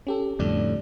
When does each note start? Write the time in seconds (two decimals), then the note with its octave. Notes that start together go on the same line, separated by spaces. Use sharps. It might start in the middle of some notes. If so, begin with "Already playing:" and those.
0.07 C#4 G4 A4
0.39 F2 A2 D3 G3 D5